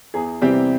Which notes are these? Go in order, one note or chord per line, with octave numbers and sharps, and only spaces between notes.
E2 G#4
C3 E3 G3 C4 G4